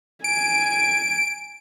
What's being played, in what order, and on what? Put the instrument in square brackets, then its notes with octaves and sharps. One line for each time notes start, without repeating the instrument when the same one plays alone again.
[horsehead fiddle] G#5 [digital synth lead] D7